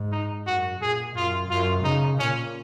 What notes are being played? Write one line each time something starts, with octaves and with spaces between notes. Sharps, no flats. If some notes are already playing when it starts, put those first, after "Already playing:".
Already playing: G#2
D#4
F#2 F#4
A#2 G#4
F#2 F4
F#2 F4
C#3 D#4
A#2 C#4